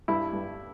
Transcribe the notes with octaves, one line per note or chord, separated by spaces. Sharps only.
G2 E4
G2